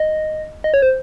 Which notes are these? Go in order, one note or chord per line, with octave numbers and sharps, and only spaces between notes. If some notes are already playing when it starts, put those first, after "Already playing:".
Already playing: D#5
D#5
C#5
C5